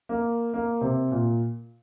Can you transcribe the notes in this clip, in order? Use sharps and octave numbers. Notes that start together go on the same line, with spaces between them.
A#3
A#3
C3
A#2